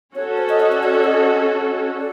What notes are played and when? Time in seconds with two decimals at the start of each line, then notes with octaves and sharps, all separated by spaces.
0.15 C#4 F#4 A4 C#5
0.38 C5
0.49 D#5
0.60 D#5
0.72 D5
0.83 C#5
0.90 D#5
0.94 D5
1.05 D#5
1.97 D5